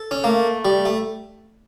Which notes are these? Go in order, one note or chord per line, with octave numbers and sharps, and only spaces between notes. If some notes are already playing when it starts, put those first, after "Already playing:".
Already playing: A4
C#4
A3 A#3
G3
A3